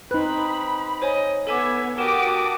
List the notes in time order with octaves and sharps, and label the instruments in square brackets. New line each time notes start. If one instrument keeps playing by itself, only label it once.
[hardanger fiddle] C4 [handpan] D#4 B4 [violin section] B5 [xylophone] F#6
[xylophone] C5 C#5 G#5 [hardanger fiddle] D#5
[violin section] B3 G#6 [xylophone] A4 G#5 D6 [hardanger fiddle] E5
[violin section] F#4 A5 D6 [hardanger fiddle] G4 D#6 [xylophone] A#4 E7